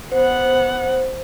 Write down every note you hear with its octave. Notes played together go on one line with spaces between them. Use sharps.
B3 C5 F#5